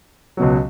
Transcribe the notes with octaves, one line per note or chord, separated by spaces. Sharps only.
C#2 B2 F#3